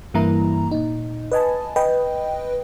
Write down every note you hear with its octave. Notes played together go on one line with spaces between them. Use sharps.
G2 E3 A#3 E4 A#5
A#2 D#4
B4 D#5 G#5 A5
B4 D#5 G5